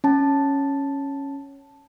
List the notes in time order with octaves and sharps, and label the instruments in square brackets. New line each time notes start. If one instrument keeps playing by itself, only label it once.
[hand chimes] C#4 A5